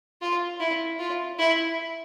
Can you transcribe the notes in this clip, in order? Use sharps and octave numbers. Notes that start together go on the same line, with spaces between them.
F4
E4
F4
E4